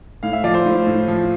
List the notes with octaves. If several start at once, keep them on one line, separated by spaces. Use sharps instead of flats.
A2 F5
E5
F3 D5
C5
A2
A2
F3